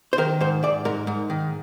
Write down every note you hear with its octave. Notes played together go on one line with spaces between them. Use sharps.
C5
D#3 A#4
G#2 C5
G#2 D5
G#2 A#4
G#2
D#3